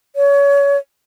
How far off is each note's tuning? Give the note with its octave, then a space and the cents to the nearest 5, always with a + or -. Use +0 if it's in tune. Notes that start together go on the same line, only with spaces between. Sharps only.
C#5 +25